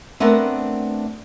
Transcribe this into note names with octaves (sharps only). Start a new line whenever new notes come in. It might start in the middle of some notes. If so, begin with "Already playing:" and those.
A3 B3 C4 D4 A#4 F#5